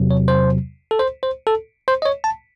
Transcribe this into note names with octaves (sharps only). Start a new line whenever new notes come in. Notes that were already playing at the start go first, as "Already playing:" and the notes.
Already playing: E2 C3 F#3
C#5
C5
A4
C5
C5
A4
C5
D#5
C#5
A5